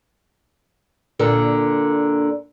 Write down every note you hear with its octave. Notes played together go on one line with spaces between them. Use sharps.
A#2 D3 A#3